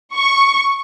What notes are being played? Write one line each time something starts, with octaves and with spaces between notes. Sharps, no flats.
C#6